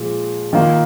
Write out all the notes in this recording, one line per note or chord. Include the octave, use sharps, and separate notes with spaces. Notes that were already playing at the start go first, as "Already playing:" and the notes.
Already playing: A#2 F3 G#3
D#3 A#3 F4